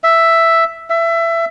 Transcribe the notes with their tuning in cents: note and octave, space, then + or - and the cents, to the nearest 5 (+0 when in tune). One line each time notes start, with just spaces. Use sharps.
E5 +5
E5 +20